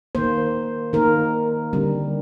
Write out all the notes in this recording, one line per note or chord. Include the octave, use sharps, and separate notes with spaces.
D#3 A#3 C5
D#3 A#3 A#4
D3 G3 C4